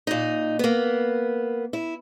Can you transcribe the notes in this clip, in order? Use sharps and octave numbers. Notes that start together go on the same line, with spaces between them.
A#2 D#4
A#3 B3
E4